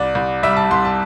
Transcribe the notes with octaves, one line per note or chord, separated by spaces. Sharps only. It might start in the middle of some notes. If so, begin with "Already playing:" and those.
Already playing: C2 D5
C2
G3 E5
A5
C2 C6
A5